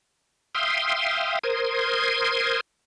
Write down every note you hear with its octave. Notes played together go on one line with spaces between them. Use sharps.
E5 F5 G5 C6 D#6
A#4 C5 C6 D#6 G#6